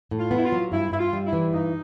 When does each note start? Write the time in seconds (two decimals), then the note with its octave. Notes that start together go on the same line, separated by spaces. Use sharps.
0.11 A2
0.19 F4
0.31 B3
0.37 E4
0.45 F4
0.52 F#3
0.72 G2 E4
0.92 G2 E4
0.99 F4
1.13 G3
1.26 E4
1.33 E3
1.53 G2 D#4